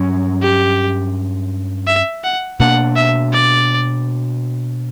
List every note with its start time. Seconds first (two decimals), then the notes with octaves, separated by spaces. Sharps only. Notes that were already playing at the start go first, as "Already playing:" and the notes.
Already playing: G2 F#3 C#4
0.42 G4
1.87 E5
2.24 F#5
2.59 B2 A#3 D4 F#5
2.96 E5
3.33 D5